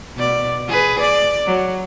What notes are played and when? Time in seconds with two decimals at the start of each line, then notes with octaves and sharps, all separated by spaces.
0.16 B2 D5
0.68 G#4 B4
1.00 D5
1.46 F#3